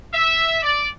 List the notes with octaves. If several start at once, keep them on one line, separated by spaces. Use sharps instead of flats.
E5
D5